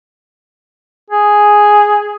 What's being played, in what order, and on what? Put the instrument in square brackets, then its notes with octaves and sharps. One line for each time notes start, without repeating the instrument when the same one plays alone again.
[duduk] G#4